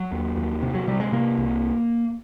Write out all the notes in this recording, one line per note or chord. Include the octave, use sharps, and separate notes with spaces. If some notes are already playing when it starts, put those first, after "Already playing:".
Already playing: F#3
D#2
D#2
C3
F#3
C3 G3
G#3
C3 A#3
C2